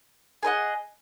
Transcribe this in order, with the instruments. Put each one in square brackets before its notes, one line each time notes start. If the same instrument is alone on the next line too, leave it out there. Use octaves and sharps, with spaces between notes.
[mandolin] G#4 B4 D#5 F#5